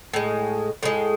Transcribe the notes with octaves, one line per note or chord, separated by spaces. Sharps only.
A2 G#3
A2 G#3 F4